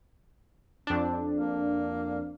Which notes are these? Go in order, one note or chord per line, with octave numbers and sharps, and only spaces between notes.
F2 C4 D4
A#3